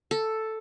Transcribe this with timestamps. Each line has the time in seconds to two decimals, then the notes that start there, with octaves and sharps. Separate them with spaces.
0.11 A4